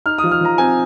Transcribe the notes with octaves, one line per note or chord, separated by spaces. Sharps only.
D#4 F6
F3 D#6
F6
F3 A#5
C4 G#5